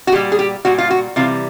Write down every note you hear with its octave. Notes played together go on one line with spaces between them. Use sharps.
F#4
A#2 G3 G4
G#4
G4
A#2 G3 F#4
F4
F#4
C3 E3 G3 F4